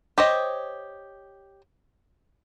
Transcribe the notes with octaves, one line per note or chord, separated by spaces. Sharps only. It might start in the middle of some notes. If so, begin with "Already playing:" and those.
G4 C5 C#5 D#5